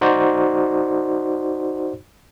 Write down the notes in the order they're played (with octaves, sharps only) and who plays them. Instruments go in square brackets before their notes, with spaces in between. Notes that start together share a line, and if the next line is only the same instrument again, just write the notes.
[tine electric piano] D#4 F#4 C5 D5